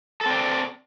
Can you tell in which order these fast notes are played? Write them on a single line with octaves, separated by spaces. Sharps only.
A4 C4 D5